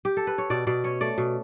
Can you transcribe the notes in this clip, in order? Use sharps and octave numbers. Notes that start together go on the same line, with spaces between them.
G4
A4
B4
C#5
B2 D5
B2 D5
C#4 C#5
A3 D5
B2